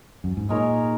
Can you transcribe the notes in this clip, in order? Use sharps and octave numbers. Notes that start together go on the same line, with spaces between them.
F#2
G#2
A#2 G#3 D#4 A#4 C#5